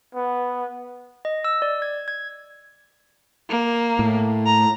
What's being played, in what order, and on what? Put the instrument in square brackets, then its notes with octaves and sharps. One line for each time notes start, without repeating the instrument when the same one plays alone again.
[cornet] B3
[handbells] D#5
E6
D5
G#6
G#6
[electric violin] A#3
[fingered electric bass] A2
[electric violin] A#5